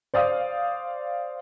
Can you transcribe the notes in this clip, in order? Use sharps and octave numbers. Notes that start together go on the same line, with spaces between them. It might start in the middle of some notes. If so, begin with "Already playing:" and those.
C5 D5 F5 D#6